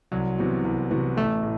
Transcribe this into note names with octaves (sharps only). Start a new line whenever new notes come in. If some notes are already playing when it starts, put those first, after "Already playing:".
C2 F#3
C3 E3 B3 F#4
C2
C3 E3 B3 F#4
A1 A3
A2